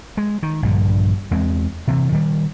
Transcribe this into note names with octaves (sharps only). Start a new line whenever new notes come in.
G#3
D#3
A#1 G2 D3
E2 G#3 C4
C3 E3
D#3 G3